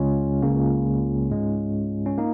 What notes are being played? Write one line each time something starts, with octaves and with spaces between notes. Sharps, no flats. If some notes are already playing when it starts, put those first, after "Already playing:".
Already playing: C#2 C#3 G#3 C#4 F4
C#2 C#3 A#3
G#2 G#3
C#4
A#3 D#4